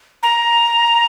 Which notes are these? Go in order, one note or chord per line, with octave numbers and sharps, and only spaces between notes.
A#5